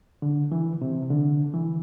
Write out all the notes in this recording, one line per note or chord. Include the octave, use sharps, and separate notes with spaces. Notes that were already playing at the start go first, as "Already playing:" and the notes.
D3
E3
C3
D3
E3